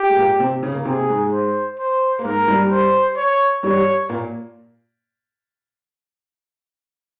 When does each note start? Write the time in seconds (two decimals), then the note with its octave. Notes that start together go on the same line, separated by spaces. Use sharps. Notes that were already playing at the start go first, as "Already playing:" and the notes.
Already playing: G4
0.10 G#3
0.16 A#2 A#3
0.39 C3 C4
0.63 C#3 C#4
0.74 A#3
0.85 C3 C4 G#4
1.09 G#2 G#3
1.32 C5
1.79 C5
2.19 A#3
2.24 G#2 G#3 A#4
2.47 G2 G3
2.71 C5
3.17 C#5
3.63 G2 G3 C#5
4.09 A#2 A#3